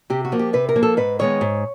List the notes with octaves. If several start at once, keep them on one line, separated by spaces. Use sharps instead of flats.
C3 G4
F#4
F3 A#3
G4
C3 B4
A#4
F3 A#3
A4
G#2 B4
D#3 G#3 B3 C#5
G#2